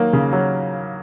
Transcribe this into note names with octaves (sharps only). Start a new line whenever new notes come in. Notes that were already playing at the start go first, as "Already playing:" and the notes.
Already playing: D#3 F#3 A#3
C#3
F#3